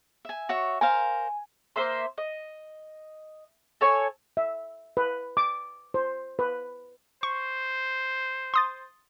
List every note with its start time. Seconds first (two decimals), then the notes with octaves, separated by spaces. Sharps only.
0.25 E5 G#5
0.49 F#4 C#5 E5
0.81 A#4 C5 F5 G#5
1.76 A#3 C5 E5 C6
2.18 D#5
3.81 A4 C#5 G#5
4.37 E5
4.97 B4
5.37 D6
5.94 C5
6.39 B4
7.23 C5 C#6
8.54 C6 D#6 A6